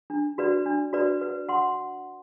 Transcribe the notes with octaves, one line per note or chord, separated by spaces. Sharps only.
D4
F#4 B4 D5
D4
F#4 B4 D5
B4
F#5 C6